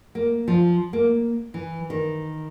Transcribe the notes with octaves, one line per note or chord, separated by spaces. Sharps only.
A#3
F3
A#3
E3
D#3